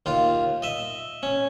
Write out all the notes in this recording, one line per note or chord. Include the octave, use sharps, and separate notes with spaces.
D#2 F4 F5
D#5 E5
C#4